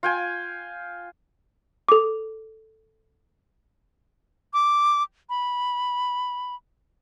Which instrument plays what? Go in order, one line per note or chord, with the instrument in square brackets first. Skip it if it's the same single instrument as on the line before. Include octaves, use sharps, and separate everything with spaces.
[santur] F4 G5 G#5
[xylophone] A4 D6
[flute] D6
B5